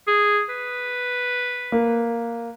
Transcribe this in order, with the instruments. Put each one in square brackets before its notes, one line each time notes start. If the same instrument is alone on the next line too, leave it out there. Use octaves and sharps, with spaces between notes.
[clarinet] G#4
B4
[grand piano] A#3